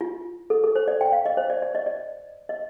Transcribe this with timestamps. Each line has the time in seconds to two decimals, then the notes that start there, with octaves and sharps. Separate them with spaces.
0.01 F4
0.50 A4
0.64 A4
0.75 C5
0.88 D5
1.01 G5
1.12 F5
1.26 D#5
1.37 C5
1.50 D5
1.62 D5
1.75 D#5
1.86 D5
2.49 D#5